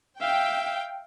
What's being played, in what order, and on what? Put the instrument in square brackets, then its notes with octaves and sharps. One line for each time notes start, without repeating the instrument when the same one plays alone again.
[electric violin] E5 F5 [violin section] G5